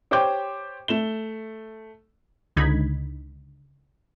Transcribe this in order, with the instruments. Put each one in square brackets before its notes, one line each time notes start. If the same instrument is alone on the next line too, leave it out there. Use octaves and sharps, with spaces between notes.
[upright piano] G4 C5 C#5 G5 D6 G6
A3 E7 G7
[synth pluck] C#2 D3 D#4 B5 G#6